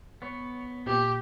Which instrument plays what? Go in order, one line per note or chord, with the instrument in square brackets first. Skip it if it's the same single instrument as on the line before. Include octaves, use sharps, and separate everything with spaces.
[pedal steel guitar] B3 C#5
[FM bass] A#2 [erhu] G4